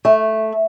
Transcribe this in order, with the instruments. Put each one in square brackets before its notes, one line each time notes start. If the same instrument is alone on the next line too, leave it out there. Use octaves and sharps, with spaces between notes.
[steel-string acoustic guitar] A3